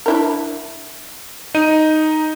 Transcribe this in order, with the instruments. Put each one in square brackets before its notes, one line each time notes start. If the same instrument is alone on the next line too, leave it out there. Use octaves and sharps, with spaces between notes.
[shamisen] D4 E4 A#4
[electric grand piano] D#4 D#7